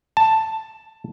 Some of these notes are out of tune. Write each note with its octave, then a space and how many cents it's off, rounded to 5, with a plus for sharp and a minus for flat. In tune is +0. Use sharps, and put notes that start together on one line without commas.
A5 +5